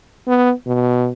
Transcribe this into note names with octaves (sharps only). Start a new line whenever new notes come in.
B3
B2